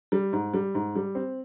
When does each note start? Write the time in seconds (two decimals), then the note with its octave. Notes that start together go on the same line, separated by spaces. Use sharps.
0.12 G3
0.33 G#2
0.54 G3
0.75 G#2
0.96 G3
1.15 C4